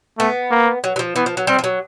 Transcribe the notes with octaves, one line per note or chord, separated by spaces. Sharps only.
A3 B3
A#3
F#3
F#3
F3
E3 B3
F3
F#3
G3 C4
F3
F#3